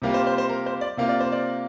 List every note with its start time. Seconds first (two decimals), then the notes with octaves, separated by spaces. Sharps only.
0.02 C3 G3 A#3 F4
0.14 C5
0.27 C5
0.38 C5
0.49 A#4
0.66 C5
0.81 D5
0.97 C3 A#3 F4 F5
1.09 D5
1.20 C5
1.32 D5